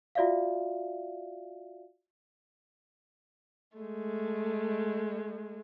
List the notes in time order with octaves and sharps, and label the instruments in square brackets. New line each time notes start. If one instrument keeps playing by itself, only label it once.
[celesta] F4 F#4 D5 E5 F5
[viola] G#3 A3